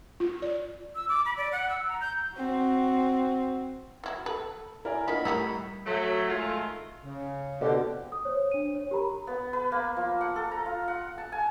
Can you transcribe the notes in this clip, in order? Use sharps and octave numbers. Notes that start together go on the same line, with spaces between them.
F4
D5
E6
D6
B5
D5
F#5
E6
A#5
G6
C4 F#4
E3 E4 F#4
A4 B4
E4 A#4 D5 G#5
A#3 B3 D4 F4 D#5 B5
A2 D#3 G3 D#4 E4 E6
F#3 A3
D#3 G#3 A3 F4
C#3
B2 D3 C4 G4
D#6
C5 C#5
D4 D#7
C#5
G4 A#4 A#5 B5
B3
B4
A#3
F3
F#5
A4
A#5
F4
F#5
A5
G#5